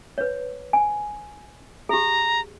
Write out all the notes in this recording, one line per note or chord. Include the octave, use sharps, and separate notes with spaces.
B4 C#5
G#5
G4 G#4 A#5